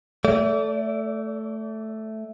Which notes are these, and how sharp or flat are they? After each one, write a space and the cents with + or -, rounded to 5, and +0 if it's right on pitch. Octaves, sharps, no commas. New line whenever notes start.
A3 +0 D5 -35